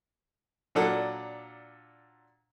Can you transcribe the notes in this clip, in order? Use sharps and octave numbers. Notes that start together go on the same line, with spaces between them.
A#2 F#3 D4 A4 F#5